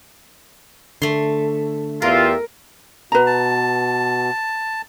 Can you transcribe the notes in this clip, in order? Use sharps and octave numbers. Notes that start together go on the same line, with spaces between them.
D3 A3 C6
E2 F4 G4 A#4 E5
B2 B4 A#5
A5